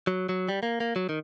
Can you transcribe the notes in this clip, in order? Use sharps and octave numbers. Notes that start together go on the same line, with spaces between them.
F#3
F#3
G3
A#3
A#3
F#3
D#3